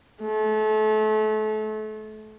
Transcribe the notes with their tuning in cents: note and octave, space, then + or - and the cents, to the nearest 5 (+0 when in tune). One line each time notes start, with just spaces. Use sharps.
A3 -30